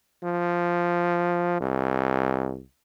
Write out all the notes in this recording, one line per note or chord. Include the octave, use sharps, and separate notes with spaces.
F3
C2